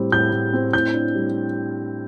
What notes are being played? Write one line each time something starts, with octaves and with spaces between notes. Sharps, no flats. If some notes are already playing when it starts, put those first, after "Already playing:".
Already playing: A2 G3 C4
A2 G6
A2
C4
A2 G6
D4
G3